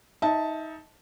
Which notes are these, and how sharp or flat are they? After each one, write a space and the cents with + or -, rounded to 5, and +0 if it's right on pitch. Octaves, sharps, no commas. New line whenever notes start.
D#4 +20 E5 +0 A5 +0